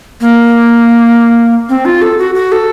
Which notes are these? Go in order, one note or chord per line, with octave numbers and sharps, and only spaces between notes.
A#3
C4
F4
A4
F#4
F#4
A4